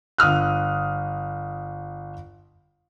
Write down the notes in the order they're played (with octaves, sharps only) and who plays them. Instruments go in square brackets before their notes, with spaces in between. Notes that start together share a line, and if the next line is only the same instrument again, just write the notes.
[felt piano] G1 D#6 F6 F#6